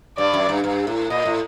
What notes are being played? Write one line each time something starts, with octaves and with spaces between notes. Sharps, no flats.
G2 D5
F#2
G2
G2
A2
A#2 D#5
A2